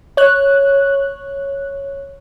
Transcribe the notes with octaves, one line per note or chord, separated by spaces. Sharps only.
C#5 F#6